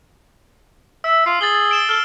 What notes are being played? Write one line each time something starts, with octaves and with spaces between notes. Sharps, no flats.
E5 E6
F4 C7
G#4 A6 F#7 G7
A6
D7 E7 G7
A4 F6